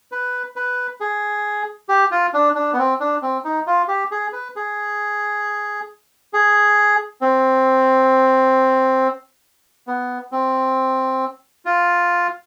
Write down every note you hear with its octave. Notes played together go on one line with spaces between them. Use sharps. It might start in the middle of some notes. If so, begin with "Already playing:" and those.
B4
B4
G#4
G4
F4
D4
D4
B3
C4
D4
C4
D#4
F4
G4
G#4
B4
G#4
G#4
C4
B3
C4
F4